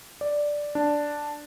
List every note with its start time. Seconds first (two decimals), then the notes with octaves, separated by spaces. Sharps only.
0.21 D5
0.75 D4